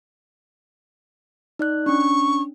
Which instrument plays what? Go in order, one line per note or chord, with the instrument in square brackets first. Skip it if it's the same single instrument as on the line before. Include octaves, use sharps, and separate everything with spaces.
[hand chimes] D#4 D5 F#6
[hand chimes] C#4 D4 [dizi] C#6